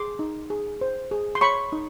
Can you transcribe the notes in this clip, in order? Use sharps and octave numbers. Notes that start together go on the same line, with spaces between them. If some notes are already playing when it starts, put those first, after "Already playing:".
Already playing: G#4 C6 D6
D#4
G#4
C5
G#4
C6
C#5 B5 C#6
D#4